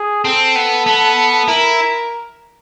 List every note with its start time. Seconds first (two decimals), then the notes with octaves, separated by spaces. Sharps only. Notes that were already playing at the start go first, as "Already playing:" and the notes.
Already playing: G#4
0.25 C4 A4
0.56 B3
0.86 B3
1.48 E4 A#4